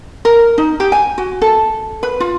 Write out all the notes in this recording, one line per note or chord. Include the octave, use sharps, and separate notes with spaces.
A#4
D#4
G4
G#5
F#4
A4
B4
F4